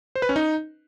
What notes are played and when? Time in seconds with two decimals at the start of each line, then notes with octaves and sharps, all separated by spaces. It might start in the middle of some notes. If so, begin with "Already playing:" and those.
0.15 C5
0.22 B4
0.29 C#4
0.36 D#4